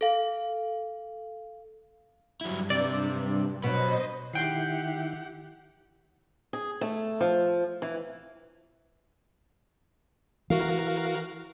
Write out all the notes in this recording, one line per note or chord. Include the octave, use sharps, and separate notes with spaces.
A4 F5
G2 F#3 E4
C3 D5
B2 F#3 B4 C5 D#5
D#3 E4 G4 F#5 G5 C7
G#4
A3
F3
E3
E3 F#4 A#4 F5